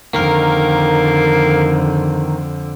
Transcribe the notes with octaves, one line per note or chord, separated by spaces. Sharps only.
F2 D3 D#3 A#3 A#4